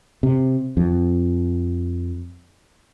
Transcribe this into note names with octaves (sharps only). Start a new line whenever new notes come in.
C3
F2